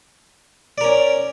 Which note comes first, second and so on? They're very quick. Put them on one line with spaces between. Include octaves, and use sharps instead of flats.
D5 A#4 C#4